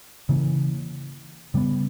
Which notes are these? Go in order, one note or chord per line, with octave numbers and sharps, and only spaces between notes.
C#3 E3 A#3
C#3 G3 B3